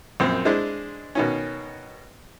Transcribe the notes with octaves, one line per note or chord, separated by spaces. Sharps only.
A#1 F#2 C4 C6
G#3 D4 E4 C5
B2 D#3 C#4